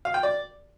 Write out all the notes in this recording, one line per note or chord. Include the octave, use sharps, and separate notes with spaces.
F5
G5
D5